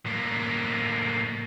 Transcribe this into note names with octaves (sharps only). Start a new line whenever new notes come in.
A2 A#3